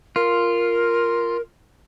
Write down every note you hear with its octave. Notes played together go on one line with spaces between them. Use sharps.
F4 A#4